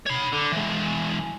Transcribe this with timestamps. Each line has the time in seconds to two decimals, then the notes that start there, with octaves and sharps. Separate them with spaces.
0.06 C#5 B5
0.33 D3
0.52 E3 G#3